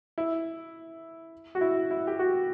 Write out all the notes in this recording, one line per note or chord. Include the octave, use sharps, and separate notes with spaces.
E4
F#4
E4
E4
G4
F#4